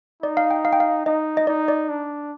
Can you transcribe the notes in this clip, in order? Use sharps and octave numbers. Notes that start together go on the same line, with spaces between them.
D#4 D5
F5
G5
F5
G5
F5
D#4 D#5
D#5
D#4 D5
D5
D4